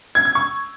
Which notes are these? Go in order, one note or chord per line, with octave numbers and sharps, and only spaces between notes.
G#6
G#6
C#6